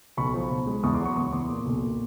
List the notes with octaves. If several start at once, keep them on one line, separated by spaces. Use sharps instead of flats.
B1 B5 C#6
F3
B1
G#3
E2 C#6 D#6
C6 D6
F#3 B5 C#6
E2 C#6 D#6
E2 C6 D6
A#2
B1
A#2